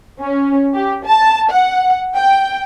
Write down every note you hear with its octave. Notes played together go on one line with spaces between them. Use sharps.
C#4
G4
A5
F#5
G5